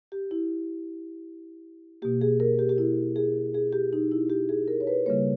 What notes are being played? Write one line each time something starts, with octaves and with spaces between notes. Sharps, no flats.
G4
E4
B2 A#3 G4
G#4
A#4
G4
G4
E4
G#4
G#4
G4
D#4
E4
G4
G#4
A#4
C#5
B4
C#3 G3 A#3 C#5